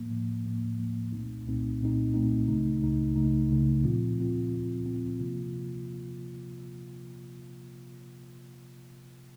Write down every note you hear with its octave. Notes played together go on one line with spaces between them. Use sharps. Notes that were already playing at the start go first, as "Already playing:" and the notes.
Already playing: A2 F3 A#3
A2 F3 A#3
A2 F3 A#3
A2 F3 A#3
C2 A#2 A3 C4 D#4
C2 A#2 A3 C4 D#4
C2 A#2 A3 C4 D#4
C2 A#2 A3 C4 D#4
C#2 C#3 A3 D#4
C#2 C#3 A3 D#4
C#2 C#3 A3 D#4
C#2 C#3 A3 D#4
A#2 F3 C4 F4
A#2 F3 C4 F4
A#2 F3 C4 F4
A#2 F3 C4 F4
C3 F3 A#3 F4